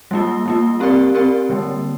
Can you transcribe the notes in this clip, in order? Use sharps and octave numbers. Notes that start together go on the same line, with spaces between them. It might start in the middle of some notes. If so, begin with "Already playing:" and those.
G3 A#3 F4
G3 A#3 F4
C4 G4 A#4 D5
C4 G4 A#4 D5
D3 G3 A#3